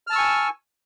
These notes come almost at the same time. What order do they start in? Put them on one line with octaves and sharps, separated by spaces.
F6 A5 E6 C#6 G#5